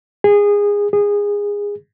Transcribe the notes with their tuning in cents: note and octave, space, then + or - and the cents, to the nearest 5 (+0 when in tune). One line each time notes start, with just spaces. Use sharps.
G#4 -20
G#4 -20